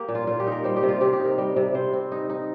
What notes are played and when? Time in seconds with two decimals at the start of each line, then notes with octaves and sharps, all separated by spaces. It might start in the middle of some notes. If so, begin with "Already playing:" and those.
Already playing: A#3 G4
0.08 A#2
0.15 F4
0.27 A#2 F4
0.40 G4
0.47 D#4
0.52 A#4
0.64 G3 C5
0.76 G4
0.83 C3
0.89 F4
1.01 C3 G4
1.13 G4
1.20 D#4
1.25 A#4
1.38 G3
1.56 C3
1.74 C3 C5
1.93 C4
2.12 D#4
2.30 D#4